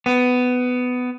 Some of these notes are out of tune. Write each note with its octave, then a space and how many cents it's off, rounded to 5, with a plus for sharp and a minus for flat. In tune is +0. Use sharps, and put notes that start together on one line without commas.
B3 +15